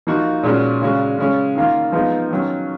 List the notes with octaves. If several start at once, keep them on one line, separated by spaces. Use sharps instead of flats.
F3 A#3 D#4 F#4
A#2 G#3 C#4 F#4
C#3 G#3 C#4 F#4
C#3 G#3 C#4
D#3 A#3 F4
F3 G#3 B3 D#4
D#3 F#3 C#4